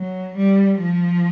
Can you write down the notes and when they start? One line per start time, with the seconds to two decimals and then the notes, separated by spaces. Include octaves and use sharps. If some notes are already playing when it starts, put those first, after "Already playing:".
Already playing: F#3
0.37 G3
0.79 F3